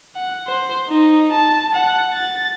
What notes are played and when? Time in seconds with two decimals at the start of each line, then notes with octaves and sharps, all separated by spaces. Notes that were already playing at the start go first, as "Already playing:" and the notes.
0.15 F#5
0.47 C5
0.89 D#4
1.32 A5
1.74 F#5
2.14 A6